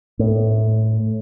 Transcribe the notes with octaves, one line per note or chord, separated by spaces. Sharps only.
A2